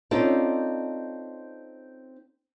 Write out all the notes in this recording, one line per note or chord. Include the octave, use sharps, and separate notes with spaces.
C4 C#4 D#4 F4 A4 D5